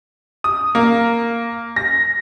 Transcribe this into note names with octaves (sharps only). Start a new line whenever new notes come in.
D#6
A#3
A#6